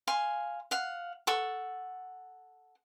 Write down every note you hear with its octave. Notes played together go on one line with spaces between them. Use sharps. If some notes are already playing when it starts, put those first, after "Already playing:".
F5 G#5 C6
F5 F#5
A4 F#5 C#6